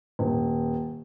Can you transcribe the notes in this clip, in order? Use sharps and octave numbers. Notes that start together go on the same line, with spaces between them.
D#1